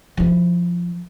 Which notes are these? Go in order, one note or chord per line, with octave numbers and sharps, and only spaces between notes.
F3 E4